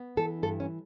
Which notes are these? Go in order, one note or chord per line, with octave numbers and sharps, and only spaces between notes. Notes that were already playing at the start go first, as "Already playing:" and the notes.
Already playing: B3
E3 A4
G2 A4
C#4